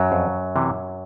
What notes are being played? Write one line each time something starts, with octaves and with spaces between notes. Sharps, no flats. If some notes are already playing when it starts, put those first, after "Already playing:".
Already playing: F#2 F#3
F2
C3 E3